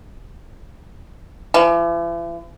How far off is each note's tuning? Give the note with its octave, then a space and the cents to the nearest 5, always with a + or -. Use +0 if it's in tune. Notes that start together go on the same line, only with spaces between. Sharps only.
E3 +45